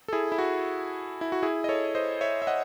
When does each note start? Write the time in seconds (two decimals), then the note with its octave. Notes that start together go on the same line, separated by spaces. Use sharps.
0.08 A4
0.13 E4 G#4
0.32 E4
0.38 F#4
1.21 E4
1.32 F#4
1.43 E4 G#4
1.64 D#5
1.69 A4 C#5
1.95 C5 D#5
2.21 C#5 E5
2.42 E5
2.47 D#5 F#5